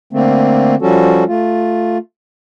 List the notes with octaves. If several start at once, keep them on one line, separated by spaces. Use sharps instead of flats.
D3 A3 A#3 C4
F3 G3 C#4 F#4 A4
A3 F4